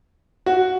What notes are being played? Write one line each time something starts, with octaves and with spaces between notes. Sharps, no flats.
F#4